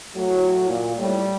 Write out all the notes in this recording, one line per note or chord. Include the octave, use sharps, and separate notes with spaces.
A2 F#3
A2
A#2
A2 G3